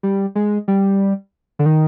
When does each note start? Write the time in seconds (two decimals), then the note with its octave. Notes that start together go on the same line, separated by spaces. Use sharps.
0.03 G3
0.35 G#3
0.68 G3
1.59 D3
1.66 D#3